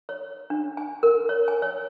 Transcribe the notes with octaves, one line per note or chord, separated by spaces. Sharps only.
C#5
D4
G#5
A#4
C#5
G#5
C#5